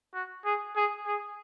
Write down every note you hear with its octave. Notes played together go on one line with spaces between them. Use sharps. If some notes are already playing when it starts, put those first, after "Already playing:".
F#4
G#4
G#4
G#4